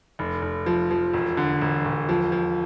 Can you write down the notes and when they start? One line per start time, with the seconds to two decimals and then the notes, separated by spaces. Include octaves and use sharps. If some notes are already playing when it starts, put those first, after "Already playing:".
0.19 F1
0.42 F1
0.66 F3
0.91 F3
1.13 E1
1.37 D3
1.61 E1
1.85 E1
2.09 F3
2.32 F3